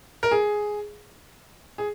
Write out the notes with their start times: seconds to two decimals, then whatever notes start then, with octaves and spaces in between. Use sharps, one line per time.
0.23 A#4
0.31 G#4
1.78 G#4